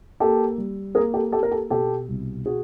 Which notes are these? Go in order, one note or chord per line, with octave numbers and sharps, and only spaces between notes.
A#3 G4 A4
G3
A#3 G#4 A#4
G4 A4
A#3 G4 A4
A#4
G4 A4
B2 G4 A4
C2
F#4 G#4